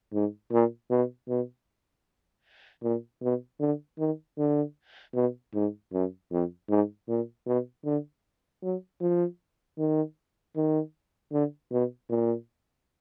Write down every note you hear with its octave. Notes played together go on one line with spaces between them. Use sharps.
G#2
A#2
B2
B2
A#2
B2
D3
D#3
D3
B2
G#2
F#2
F2
G#2
A#2
B2
D3
F#3
F3
D#3
D#3
D3
B2
A#2